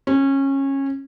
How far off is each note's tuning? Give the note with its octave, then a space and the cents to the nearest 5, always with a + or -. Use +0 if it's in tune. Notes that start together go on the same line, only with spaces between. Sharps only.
C#4 -20